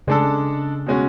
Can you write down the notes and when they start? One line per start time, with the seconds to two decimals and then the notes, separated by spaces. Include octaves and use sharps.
0.07 C#3 G#3 D4 A4
0.86 B2 G#3 C#4 F#4